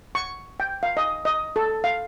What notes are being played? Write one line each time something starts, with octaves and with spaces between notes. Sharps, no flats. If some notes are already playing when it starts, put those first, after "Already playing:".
C#6
G5
F5
D#5
D#5
A4
F5